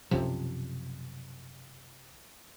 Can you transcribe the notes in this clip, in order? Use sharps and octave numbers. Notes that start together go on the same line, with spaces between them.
B1 F#2 C3 F3